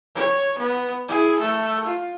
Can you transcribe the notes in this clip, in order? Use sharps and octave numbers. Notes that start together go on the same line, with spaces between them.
C#5
B3
E4 G#4
A3 A4
F4